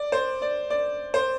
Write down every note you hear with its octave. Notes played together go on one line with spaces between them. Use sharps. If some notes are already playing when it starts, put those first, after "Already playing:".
Already playing: D5
C5
D5
D5
C5